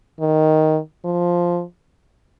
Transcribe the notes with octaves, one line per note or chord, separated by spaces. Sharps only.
D#3
F3